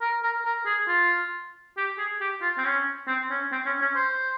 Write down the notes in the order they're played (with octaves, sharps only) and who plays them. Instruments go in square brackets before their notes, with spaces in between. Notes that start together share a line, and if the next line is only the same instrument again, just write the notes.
[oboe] A#4
A#4
A#4
G#4
F4
G4
G#4
G4
F4
C4
C#4
C4
C#4
C4
C#4
C#4
C5